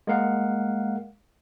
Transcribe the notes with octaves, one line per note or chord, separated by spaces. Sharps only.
G#3 A#3 A#4 F5 F#5